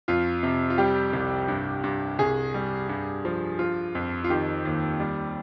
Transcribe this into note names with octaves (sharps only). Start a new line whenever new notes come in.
F2 F4
C3
F4
G3 G4
C2
G2
G2
C2 G#4
G3
G2
F3
F3 F4
F2
F4
D#3 G4
D#2
G3